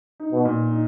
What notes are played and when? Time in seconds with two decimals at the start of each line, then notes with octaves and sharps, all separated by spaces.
0.20 D#4
0.32 B2
0.45 A#2
0.71 D#4